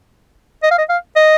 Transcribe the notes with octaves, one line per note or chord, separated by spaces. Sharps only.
D#5
F5
D#5
F5
D#5